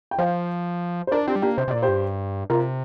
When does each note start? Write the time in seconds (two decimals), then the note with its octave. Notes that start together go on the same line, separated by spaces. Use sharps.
0.11 G5
0.18 F3 C5 F5
1.07 C5
1.12 D4 A#4 D5
1.27 C4 D4 G4
1.36 G3
1.42 A#3 D4 G4
1.58 C3 C5
1.68 C3
1.71 A#2 D5
1.83 G4 C5
1.88 G2
2.50 C3 F4 A#4